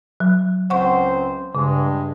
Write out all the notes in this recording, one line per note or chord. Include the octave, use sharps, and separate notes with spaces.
F#3
C#2 C4 C5 F#5 C#6
G2 C#3 G#3